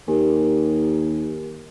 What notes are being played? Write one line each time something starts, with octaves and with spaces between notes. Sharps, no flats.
D#2 G4 A#4 G#5